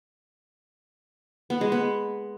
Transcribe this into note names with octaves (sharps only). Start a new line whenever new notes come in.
B3
G#3
B3